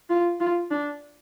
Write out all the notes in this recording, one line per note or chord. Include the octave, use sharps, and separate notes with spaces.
F4
F4
D4